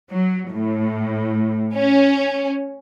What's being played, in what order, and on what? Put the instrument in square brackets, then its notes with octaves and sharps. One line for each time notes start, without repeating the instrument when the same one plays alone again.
[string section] F#3
A2
C#4